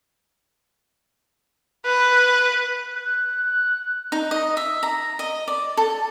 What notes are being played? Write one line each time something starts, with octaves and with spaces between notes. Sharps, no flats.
B4
F#6
D#4
D#5
E5
A#5
D#5
D5
A4